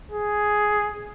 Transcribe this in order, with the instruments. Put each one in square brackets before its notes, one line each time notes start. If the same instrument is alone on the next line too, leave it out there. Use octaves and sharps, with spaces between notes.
[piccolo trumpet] G#4